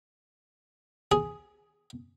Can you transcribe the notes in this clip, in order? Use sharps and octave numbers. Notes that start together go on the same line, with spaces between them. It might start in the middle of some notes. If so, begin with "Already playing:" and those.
G#4